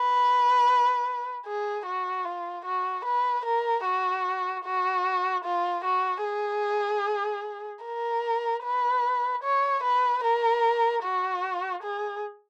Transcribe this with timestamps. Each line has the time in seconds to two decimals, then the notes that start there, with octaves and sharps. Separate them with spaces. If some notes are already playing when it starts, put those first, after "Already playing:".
Already playing: B4
1.45 G#4
1.86 F#4
2.25 F4
2.65 F#4
3.05 B4
3.45 A#4
3.85 F#4
4.65 F#4
5.44 F4
5.85 F#4
6.24 G#4
7.84 A#4
8.64 B4
9.44 C#5
9.83 B4
10.24 A#4
11.03 F#4
11.83 G#4